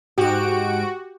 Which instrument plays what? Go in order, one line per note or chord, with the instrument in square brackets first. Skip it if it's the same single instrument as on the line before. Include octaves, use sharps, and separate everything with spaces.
[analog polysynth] G#2 D7 [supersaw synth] F#4 [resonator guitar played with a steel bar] G4